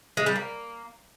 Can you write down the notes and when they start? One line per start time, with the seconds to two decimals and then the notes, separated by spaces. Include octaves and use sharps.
0.17 G#3
0.26 G3
0.36 A#3